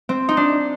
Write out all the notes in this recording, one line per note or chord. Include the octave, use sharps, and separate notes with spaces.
C4
D#4
D4